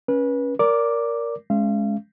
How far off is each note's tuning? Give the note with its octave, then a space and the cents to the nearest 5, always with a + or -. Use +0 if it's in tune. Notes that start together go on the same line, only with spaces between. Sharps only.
C#4 +0 B4 -30
A#4 +0 D5 -25 D6 +0
G#3 +15 C#4 +0 F5 -35